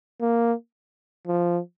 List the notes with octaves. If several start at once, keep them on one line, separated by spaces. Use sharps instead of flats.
A#3
F3